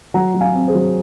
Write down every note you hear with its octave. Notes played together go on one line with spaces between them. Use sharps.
F#3 F#5 A#5
F#3
F5 G#5
C4
G#4 C5
F#3